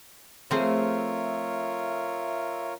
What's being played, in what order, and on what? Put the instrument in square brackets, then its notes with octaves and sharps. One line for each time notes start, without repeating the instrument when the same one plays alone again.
[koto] F3 C4 [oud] A3 G#4 [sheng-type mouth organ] F4 A#4 C#5 [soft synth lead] E5